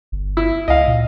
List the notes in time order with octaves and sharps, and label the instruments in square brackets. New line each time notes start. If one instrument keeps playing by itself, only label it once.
[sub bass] G1
[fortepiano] E4
[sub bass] C#2 [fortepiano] D#5 F5
[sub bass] A#2